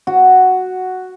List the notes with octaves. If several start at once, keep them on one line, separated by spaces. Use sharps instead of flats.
F#4